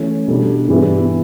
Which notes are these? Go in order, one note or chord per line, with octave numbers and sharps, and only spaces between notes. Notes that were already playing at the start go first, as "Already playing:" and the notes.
Already playing: E3 A3 C#4
B2 G3 D4 A4
G2 E3 B3 E4 G4